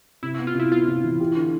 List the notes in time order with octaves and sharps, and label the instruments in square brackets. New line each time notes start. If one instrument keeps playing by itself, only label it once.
[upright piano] C3 [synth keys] E4
[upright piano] B3 [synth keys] E4
[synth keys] F4
[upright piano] C3 [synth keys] E4
[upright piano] B3 [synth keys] F4
[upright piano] C3
E3
G4
D3